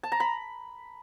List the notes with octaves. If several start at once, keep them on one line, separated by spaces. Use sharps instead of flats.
A5
A#5
B5